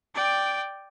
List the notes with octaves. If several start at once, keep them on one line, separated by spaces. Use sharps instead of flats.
D5 G5